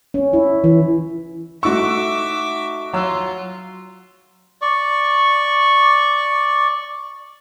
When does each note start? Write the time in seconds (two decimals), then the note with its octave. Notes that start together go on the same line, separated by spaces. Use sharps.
0.14 C#4
0.33 E4
0.64 E3
1.63 A3 D#4 F#4 E5 C#6 D6 E6
2.93 F#3 F4 E6
4.62 D5 C#6